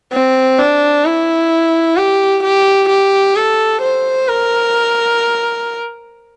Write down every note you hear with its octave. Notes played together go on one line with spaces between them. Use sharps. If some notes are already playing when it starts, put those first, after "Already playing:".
C4
D4
E4
G4
G4
G4
A4
C5
A#4